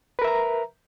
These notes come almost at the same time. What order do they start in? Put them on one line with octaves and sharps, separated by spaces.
B4 A#4 E5 A#5